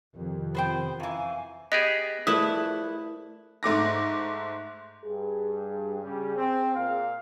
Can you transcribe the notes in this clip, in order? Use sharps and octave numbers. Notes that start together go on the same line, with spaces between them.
F2 C3 D#3
B3 C5 G5
F#2 E3 F5 G#5
B3 G4 G#4 D#5 A#6
A#1 A3 E4 G#4 B4 D#6
G#2 A3 D6 A#6
G2 G#4
C#3 G3 C#4
C4
A#2 F5